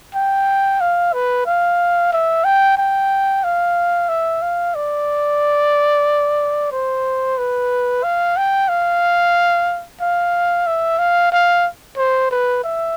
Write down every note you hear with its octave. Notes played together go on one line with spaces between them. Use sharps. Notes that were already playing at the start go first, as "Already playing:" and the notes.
G5
F5
B4
F5
E5
G5
G5
F5
E5
F5
D5
C5
B4
F5
G5
F5
F5
E5
F5
F5
C5
B4
E5